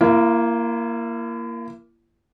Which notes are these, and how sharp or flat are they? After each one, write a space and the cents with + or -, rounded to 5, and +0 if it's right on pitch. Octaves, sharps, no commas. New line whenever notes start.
A#3 +0 E4 +40